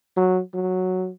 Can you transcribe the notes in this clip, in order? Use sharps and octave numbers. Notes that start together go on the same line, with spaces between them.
F#3
F#3